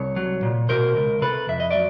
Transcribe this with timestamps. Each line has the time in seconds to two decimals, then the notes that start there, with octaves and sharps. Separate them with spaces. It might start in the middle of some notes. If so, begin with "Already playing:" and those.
Already playing: C2 C#5
0.16 F#3
0.43 A#2
0.69 B2 A#4 C5
0.96 C#2
1.22 C3 A4 B4
1.48 F2 E5
1.60 D#5
1.71 F#3 D5 E5